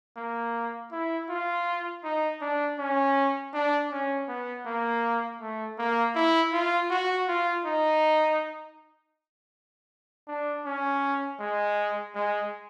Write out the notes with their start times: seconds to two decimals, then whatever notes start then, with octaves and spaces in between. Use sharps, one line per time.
0.17 A#3
0.92 E4
1.29 F4
2.04 D#4
2.41 D4
2.78 C#4
3.54 D4
3.91 C#4
4.29 B3
4.66 A#3
5.41 A3
5.78 A#3
6.15 E4
6.53 F4
6.90 F#4
7.28 F4
7.66 D#4
10.28 D4
10.65 C#4
11.40 G#3
12.15 G#3